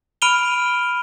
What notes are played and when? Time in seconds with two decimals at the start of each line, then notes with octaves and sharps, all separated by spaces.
0.22 B5 F6 D7 D#7 F7 G7